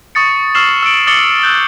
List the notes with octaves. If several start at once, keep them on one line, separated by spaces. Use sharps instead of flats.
C#6 D#6 A6 C#7
C#6 E6 F6 C7 E7 F#7
E6 C#7 D7 F#7
D6 D#6 A6 C#7 F#7 G7
E6 F#6 G6 F#7